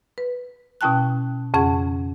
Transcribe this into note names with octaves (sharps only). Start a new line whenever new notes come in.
B4
B2 C#4 E4 G5 A5 F#6
F2 C#3 C#4 G#4 F#5 G#6